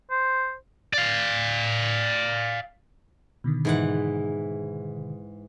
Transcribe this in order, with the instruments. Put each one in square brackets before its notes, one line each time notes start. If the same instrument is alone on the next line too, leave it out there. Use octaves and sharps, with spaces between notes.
[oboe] C5
[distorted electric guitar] D5 F5
[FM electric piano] B2 D3 D#3
[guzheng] G#2 E3 F#5